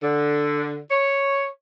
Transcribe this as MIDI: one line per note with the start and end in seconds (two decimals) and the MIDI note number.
0.02 0.78 50
0.89 1.46 73